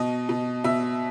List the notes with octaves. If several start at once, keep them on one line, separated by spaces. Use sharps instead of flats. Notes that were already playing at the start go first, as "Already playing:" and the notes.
Already playing: B2 D#5
B2
B2 E5